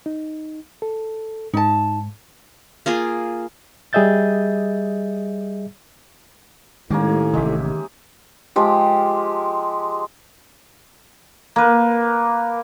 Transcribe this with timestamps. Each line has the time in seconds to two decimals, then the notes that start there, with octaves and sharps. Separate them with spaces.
0.06 D#4
0.82 A4
1.54 G#2 D#4 A5
2.86 A#3 F4 G#4
3.93 G3 G#4 D#5 E5 G6 A6
6.90 A2 D#3 G#3 A#3 C#4 G4
7.34 A1 C3 G#3 G4 E5
8.56 F3 G#3 G4
11.56 A#3 B4